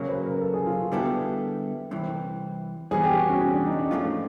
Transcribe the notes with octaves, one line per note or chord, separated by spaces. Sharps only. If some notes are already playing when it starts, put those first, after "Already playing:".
Already playing: C#3 F#3 A#3 C#5
B4
A#4
A4
G#4
F4
F#4
D3 G3 B3 E4 G4 A4
C2 C3 E3
E3 G3 B3 G#4
G4
F#4
C#4
C#4
D4
D#4
D4
G#2 F3 A3 C#4 F4